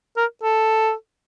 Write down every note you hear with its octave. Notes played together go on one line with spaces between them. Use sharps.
A#4
A4